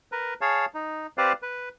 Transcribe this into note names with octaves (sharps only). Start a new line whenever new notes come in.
A#4 B4
G#4 C#5 F5 A5
D#4
C4 G4 B4 C5 D5 F5
B4